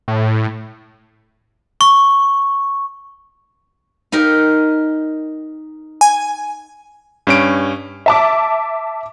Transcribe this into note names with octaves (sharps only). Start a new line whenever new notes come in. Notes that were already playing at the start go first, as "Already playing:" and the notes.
A2
C#6
D#4 G4 A#4
G#5
G2 C#4 D7
E5 A5 D6